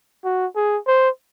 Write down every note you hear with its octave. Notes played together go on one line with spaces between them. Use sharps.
F#4
G#4
C5